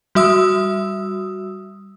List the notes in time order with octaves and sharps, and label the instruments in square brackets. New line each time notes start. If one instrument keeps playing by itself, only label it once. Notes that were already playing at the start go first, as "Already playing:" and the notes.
[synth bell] G3 F#4 E5 D#6 E6